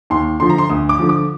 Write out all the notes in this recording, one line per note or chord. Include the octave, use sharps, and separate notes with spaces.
D#2 C6
D3 F3 C6
A#5
C6
D2 D#6
D6
D3 F3
D6